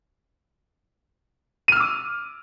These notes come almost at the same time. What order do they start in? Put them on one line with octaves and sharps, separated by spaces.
D#7 F6 E6 D6